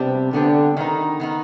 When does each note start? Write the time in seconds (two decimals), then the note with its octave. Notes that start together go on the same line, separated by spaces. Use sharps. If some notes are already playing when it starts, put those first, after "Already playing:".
Already playing: C3 G3 B3 D4 G4
0.33 D3 G3 B3 D4 G4
0.77 D#3 B3 D#4
1.20 D#3 B3 D#4